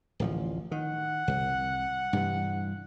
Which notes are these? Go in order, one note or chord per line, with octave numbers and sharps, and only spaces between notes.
D1 A1 F3
D#3 F#5
C2
G2 C3 E3